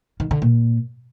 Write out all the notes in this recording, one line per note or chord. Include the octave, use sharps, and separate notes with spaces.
D#3
D3
A#2